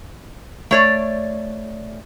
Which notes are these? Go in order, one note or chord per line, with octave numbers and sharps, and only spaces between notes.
A3 C#5 D5